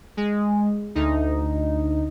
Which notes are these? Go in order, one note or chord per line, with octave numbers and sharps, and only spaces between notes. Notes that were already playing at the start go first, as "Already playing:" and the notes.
G#3
D2 D#4